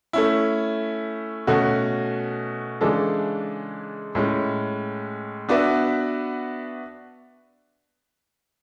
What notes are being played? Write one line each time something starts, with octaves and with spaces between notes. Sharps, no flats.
A3 C#4 E4
B2 A3 C#4 F#4
C#3 E3 G#3 D4 A4
A2 G#3 C#4
B3 D4 F#4 B4 E5